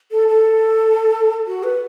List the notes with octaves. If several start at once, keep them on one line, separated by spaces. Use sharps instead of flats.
A4
A4
F#4
B4